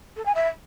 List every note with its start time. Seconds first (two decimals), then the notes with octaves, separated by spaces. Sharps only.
0.16 A4
0.25 G#5
0.34 E5